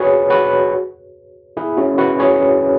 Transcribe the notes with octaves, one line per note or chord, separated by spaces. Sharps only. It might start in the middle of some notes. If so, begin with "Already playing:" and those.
Already playing: F#4 G#4 B4 C#5
F#4 B4
E4 G#4
C#4 F#4
F#4 B4
G#4 C#5